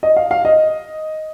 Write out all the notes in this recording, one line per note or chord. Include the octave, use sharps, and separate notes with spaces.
D#5
F5
F5
D#5